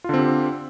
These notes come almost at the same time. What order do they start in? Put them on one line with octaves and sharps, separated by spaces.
F4 D3 C4 G4